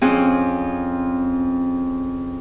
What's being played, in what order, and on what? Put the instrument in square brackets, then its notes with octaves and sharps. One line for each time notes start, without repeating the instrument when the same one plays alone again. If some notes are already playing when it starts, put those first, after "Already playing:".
[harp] F2 C4 C#4 G#4 F#6